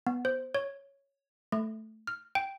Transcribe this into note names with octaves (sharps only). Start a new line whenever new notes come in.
B3
C5
C#5
A3
F6
G5